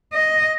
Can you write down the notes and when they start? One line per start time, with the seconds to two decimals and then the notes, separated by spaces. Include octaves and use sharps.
0.13 D#5